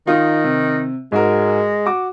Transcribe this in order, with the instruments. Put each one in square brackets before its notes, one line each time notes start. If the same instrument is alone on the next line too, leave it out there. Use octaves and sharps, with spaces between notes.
[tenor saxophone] D#3 [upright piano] D#4 F4
[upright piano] C3
[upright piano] G#2 F#4 A#4 [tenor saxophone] G#3
[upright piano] F#4 D6